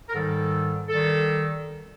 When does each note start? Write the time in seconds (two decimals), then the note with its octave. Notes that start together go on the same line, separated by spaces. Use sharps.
0.09 A#4
0.14 G#2 D#3 G3 A4
0.88 D#3 G3 A4